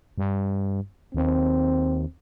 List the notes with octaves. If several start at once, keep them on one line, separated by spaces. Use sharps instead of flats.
G2
D#2 C4